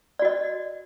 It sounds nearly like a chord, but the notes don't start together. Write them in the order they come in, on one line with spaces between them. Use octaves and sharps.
D5 F#4 D#5